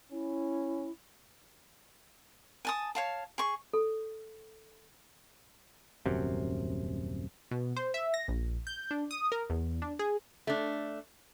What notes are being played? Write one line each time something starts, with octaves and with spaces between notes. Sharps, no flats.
C#4 E4
G#5 A5 D#6
C#5 F5 A5
G#4 C#6
A4
D#1 F#2 C3
B2
C5
E5
A#6
A#1
G6
D4
D#6
A#4
E2
D4
G#4
A3 D4